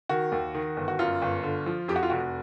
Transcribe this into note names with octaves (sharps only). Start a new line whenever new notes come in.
D#3 F#4
D#2
D#3
G1
F#4
F#2 F4
G1
D3
F3
F2 G4
F#4
F4
F1 F#4